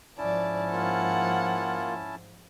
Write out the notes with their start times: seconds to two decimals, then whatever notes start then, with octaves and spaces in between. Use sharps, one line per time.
0.18 G#2 F3 C#4 E4 D5 A5
0.71 A#3 F4 F#5